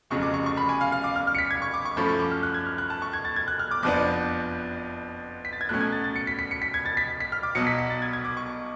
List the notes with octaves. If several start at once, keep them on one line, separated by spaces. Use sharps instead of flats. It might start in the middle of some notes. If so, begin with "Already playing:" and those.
F1 F2 C#3 F#3 C#6
D6
C#6
C#6
B5
G#5
F5
F5
D6
F6
F6
C#7
B6
G#6
C#6
D6
C#6
F#2 F3 A3 C#4 B5
C#6
D6
F6
F#6
G#6
F6
F#6
A5
C#6
G#6
A6
G#6
F#6
F6
D6
F#1 F2 F3 B3 D4 D6
B6
A6
G#6
B1 A2 F#3 C#4 F#6
G#6
A6
A6
C#7
B6
B6
C#7
B6
G#6
A6
B6
B6
F6
D6
B1 B2 F#3 C#7
B6
B6
A6
G#6
G#6
D6
C#6